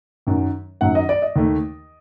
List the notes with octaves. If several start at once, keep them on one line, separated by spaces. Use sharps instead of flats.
F#2 D#3 F#3
F#2 D#3 F#3 F#5
D#5
D5
D#5
D#2 D#3 A3